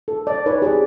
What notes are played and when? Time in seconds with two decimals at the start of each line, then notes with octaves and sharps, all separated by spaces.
0.08 A4
0.27 D5
0.46 D#4 B4 C#5 D5
0.62 G4 G#4 D5